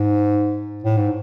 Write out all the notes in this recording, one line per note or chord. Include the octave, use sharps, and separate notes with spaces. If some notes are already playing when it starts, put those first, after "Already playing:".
Already playing: G#2
A2
G#2